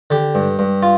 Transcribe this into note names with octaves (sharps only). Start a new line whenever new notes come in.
D3 G4
G2
G2
F4